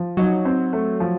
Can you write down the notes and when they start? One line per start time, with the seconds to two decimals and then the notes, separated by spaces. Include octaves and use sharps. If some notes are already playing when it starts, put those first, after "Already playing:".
Already playing: F3
0.17 F#3 D#4
0.45 C4
0.73 A3
1.00 F3